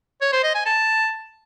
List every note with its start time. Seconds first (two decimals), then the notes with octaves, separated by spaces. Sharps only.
0.21 C#5
0.33 C5
0.44 D#5
0.55 G#5
0.66 A5